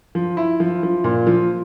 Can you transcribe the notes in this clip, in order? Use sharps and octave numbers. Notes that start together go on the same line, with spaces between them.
F3
E4
F3
F3
A#2
F3